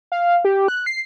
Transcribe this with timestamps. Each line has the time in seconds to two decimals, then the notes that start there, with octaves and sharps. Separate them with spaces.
0.12 F5
0.45 G4
0.68 F#6
0.86 C7